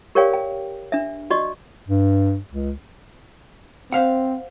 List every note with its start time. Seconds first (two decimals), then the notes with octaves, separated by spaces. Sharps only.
0.15 G4 A#4 C#5 D5 F5 G5
0.34 G5
0.92 D4 E5
1.30 F#4 D5 D#5 C#6
1.88 G2
2.51 C#2
3.92 C4 C5 F5 F#5